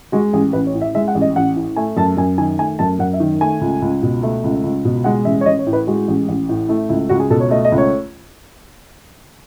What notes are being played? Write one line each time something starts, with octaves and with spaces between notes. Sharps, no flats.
G#3 F#4
A1 G#4
A1 B4
C#5
A2
E5
G#3 E5
F#5
A1
D#5
A1 F#5
A2
A3 G#5
F#2 A5
F#2 G#5
D#3 G#5
A3 G#5
F#2 A5
F#2 F#5
E5
D#3
A3 G#5
C#2
C#2
B2
A3
C#2
C#2
B2
G#3 F#5
A1 E5
C#5
A1 D#5
C#5
A2
B4
G#3 F#4
A1
A1
A2
A3 E4
C#2 E4
C#2 F#4
G#4
B2 A4
C#5
A3 D#5
D#5
C#2
C#5